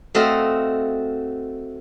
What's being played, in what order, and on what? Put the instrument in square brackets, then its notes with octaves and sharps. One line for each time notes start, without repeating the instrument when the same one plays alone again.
[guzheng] A3 C4 F#4 D#5 F5